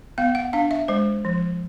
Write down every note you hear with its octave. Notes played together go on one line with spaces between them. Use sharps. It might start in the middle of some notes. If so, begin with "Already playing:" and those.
B3 F5
F#5
D4 F5
E5
G#3 C5
F3